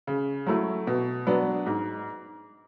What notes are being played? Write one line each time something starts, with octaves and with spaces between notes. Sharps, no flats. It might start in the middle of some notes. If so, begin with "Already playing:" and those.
C#3
F#3 A3 E4
B2
F#3 B3 D4
G#2